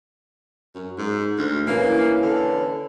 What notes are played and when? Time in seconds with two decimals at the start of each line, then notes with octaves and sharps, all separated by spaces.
0.75 F#2
0.98 G#2
1.38 D2
1.67 E3 A#3 C#4
2.22 D3